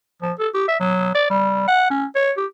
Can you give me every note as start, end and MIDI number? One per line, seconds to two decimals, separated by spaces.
0.22 0.33 53
0.39 0.49 69
0.54 0.68 67
0.68 0.80 76
0.80 1.12 54
1.15 1.27 74
1.30 1.65 55
1.68 1.86 78
1.90 2.06 61
2.15 2.32 73
2.37 2.46 67